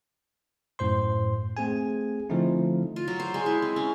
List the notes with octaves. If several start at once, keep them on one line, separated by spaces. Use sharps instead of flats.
F#2 A2 C5 C6
A3 C4 G#4 G#5
D3 F3 A3 C4 D#4 E4
F4
F#3
C5
G#3
E4
C4
C#4